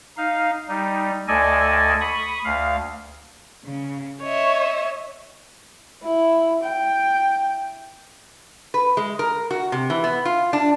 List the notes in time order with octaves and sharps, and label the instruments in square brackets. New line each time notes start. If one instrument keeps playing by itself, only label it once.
[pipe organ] D#4 F5
G3 D#4
D2 A4 D5 D#5 G#5
B5 C#6 D#6
D2 F5
[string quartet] C#3
C#5 D#5 E5
[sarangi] E4
G5
[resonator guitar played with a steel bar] B4
G#3
A#4
F#4
C3
E3
B3
F4
D4